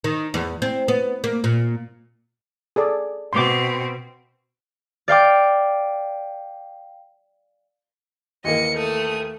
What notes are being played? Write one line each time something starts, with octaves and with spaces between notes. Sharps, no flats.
D#3
E2
C4
B3
A#3
A#2
G#4 A4 D5
B2 C4 C6 D6
D5 F5 G5 D6
D#2 E3 A#3 D#5 C#7
A3 D#6